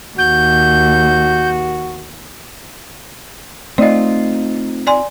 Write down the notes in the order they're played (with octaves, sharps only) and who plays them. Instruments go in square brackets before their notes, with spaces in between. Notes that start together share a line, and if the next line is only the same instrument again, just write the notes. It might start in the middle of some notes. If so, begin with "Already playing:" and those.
[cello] D#2 [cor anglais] F#4 [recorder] G6
[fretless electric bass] A3 [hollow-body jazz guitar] C4 D#4 F4 [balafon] D5 D#5
[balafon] D5 G#5 C6